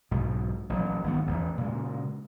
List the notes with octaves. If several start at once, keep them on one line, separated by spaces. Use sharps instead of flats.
B1 G#2 B2
A1 A#2 F#3
G#1 D#3 A3 B3
A1 E2
A#2 C#3 G#3